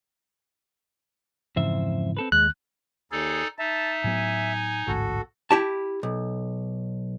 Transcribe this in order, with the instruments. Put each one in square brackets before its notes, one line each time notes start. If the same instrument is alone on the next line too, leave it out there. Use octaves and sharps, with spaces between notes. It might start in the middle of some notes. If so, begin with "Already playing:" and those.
[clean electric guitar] F2 C5 E5 [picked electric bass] G#2 C#3 E3
[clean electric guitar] C4 A4 B4
[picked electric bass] D#2 [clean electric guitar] G#3 [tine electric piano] F#6
[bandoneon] D#2 [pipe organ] D#4 A4 D5 [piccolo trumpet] G#4
[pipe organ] D#4 [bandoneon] E5 [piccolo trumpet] A5
[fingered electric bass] A2 F#3 B3 [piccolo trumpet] G#5
[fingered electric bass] A1 D2 G#2 [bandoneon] F#4 A4
[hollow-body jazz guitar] E4 G4 A5
B1